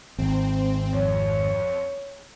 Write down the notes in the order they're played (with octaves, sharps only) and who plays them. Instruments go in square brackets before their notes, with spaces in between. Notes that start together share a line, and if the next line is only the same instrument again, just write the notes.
[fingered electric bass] G#1 [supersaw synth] C4
[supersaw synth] F2 [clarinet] C#5